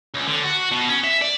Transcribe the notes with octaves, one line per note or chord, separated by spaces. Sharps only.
C#2
D3
F#4
B2
C#4
E5
D5